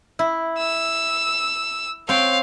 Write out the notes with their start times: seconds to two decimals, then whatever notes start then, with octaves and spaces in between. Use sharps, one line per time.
0.19 E4
0.59 E6
2.09 C4 C#5 F5 G5